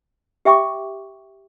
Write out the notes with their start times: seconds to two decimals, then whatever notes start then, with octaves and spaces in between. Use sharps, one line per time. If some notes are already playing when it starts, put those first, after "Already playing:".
0.45 G4 E5 G5 C#6 D6